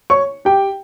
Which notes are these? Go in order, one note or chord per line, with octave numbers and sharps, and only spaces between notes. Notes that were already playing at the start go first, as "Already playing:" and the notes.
C#5 C#6
G4 G5